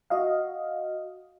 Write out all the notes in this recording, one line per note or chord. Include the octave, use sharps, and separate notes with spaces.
F#4 D#5 F5